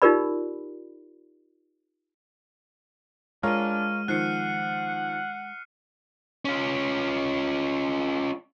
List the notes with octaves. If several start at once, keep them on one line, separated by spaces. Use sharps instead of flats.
D#4 F4 G4 A#4 D5 B5
G#3 D4 F4 A#4 C#5 F6 D#7
D#3 F3 F#5 F#6 C7 C#7
C#4 F4